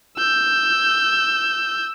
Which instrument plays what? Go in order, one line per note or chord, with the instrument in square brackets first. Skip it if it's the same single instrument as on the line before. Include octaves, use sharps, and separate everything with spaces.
[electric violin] E6 G6